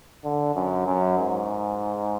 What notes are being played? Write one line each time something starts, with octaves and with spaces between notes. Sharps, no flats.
D3
F#2
F#2
G#2